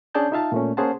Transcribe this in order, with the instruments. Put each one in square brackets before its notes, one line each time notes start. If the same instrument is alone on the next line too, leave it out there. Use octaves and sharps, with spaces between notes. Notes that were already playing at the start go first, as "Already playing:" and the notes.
[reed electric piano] C#4 D4 G#4 D5 A5 G6
D#4 F4 E5 F5 A5
A#2 A3 C#4
A#3 C#4 G#4 C5 F#5 A5